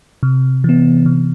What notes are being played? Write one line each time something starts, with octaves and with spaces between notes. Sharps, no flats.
C3
E3 B3
C3